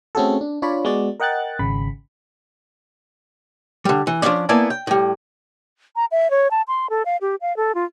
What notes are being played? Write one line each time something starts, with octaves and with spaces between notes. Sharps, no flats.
A3 C4 C#4 F#4 G#4 A4
D4
D4 F4 C#5 D5 B5
G#3 B3 F#4 D5
A#4 D#5 F#5 G5 F#6 A6
G#1 C#3 B5
D3 G3
E3
F3 A#3 C#4 D4 D5
A#3 B3 E4 D5 G#5 A5
G5
A2 G3
A#5
E5
C#5
A5
C6
A4
F5
G4
F5
A4
F4